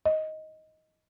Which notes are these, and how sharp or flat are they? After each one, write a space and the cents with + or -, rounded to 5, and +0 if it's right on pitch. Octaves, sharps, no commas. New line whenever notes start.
D#5 +10